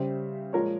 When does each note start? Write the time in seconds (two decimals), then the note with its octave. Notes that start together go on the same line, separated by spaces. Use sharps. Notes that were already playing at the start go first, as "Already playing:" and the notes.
Already playing: C#3 G3 C5 E5
0.53 A#2 F3 G#3 A#4 C#5